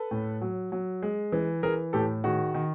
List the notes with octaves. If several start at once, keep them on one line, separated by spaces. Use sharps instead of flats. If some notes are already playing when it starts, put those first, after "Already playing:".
Already playing: A4 B4
A2
F#3
F#3
G#3
E3
E3 G#4 A#4
A2 G4 A4
D#3 F#4 G#4
D#3